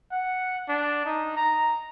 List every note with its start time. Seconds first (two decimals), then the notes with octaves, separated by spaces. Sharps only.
0.11 F#5
0.69 D4
1.06 D#4
1.37 A#5